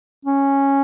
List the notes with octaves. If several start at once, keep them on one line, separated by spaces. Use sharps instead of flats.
C#4